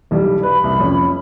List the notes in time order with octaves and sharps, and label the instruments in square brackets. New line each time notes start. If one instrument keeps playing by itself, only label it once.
[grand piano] B1 E3 G3
[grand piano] B4 [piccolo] B5
[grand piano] C2
F2 C#4